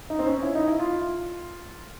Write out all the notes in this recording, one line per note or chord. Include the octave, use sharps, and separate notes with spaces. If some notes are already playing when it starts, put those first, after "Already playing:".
D#4
C4
C#4
E4
D#4
E4
F4